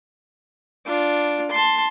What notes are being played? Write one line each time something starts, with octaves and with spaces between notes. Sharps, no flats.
D4 F4
A5 C6